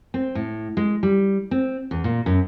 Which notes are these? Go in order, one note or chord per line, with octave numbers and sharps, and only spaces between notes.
C4
A2
G#3
G3
C4
E2
A#2
F#2